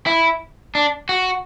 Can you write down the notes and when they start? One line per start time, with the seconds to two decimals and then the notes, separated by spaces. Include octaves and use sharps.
0.06 E4
0.75 D4
1.09 F#4